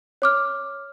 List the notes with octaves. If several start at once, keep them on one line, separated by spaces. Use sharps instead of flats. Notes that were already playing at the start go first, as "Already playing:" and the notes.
C#5 D6 F6